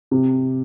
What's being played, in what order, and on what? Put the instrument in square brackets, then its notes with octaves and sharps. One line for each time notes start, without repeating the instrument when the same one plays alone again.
[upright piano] C3